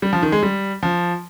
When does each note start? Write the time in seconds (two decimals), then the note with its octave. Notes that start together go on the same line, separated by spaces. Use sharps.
0.02 G3
0.13 F3
0.22 D#3
0.32 G#3
0.43 G3
0.83 F3